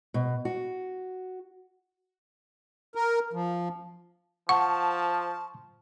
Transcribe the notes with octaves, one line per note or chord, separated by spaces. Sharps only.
B2
F#4
A#4
F3
F3 F#5 A5 C#6